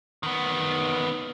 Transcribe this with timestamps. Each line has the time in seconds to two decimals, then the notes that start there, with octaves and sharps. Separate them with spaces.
0.23 D#3 B3